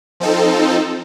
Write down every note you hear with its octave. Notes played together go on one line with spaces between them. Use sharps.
F3 C4 D#4 A4